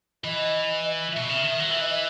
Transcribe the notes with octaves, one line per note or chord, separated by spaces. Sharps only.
E3 D#5
B2 E5
C#3
D#3
F#3
E3 E5
D#5
E5